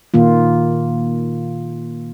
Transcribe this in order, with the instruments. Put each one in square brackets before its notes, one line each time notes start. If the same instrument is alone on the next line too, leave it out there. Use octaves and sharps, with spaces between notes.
[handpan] A#2 D#3 A#3 F4